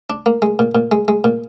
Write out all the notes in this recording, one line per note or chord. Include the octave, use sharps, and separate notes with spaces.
D4
A#3
G#3
A#2
A#2
G#3
G#3
A#2